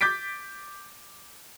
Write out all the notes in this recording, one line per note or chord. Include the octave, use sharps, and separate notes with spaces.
D6 G6 A6 B6 D7